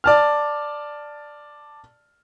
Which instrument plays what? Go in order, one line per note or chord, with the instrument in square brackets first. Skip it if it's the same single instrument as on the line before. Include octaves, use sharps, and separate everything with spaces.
[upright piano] D5 A5 F6